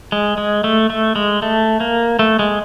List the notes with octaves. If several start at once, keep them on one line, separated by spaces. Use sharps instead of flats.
G#3
G#3
A3
A3
G#3
A3
A#3
A3
G#3